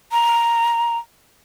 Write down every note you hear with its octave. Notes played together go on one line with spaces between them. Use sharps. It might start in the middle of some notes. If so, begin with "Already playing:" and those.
A#5